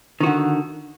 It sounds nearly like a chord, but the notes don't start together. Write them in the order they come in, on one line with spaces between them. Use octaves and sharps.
D#3 F#4 D3